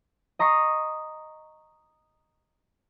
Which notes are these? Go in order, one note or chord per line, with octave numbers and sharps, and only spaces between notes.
D#5 A#5 C#6 D#6 C7